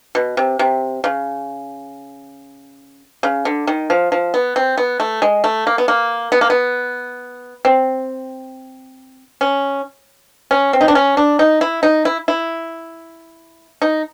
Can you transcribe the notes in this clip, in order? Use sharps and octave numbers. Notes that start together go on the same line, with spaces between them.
B2
C3
C3
C#3
C#3
D3
D#3
F3
F3
B3
C4
B3
A3
G#3
A3
A#3
B3
A#3
B3
A#3
B3
C4
C#4
C#4
C4
D#4
D4
C#4
D4
D#4
E4
D#4
E4
E4
D#4